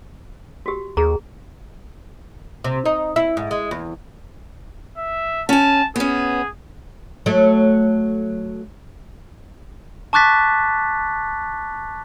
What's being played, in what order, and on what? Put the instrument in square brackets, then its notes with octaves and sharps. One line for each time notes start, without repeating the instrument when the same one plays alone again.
[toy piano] F#4 G4
[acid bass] D#2 [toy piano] G#4 A#5
[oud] C3
D#4
E4
G#2
G#3
E2
[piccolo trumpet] E5
[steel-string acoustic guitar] C#4 G#5 [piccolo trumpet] A5
[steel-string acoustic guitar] B3 C#4 [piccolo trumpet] G#4
[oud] F#3 A3
[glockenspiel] A5 C#6 D6 F#6 A6 B6